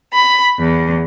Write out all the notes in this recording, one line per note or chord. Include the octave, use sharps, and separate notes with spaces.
B5
E2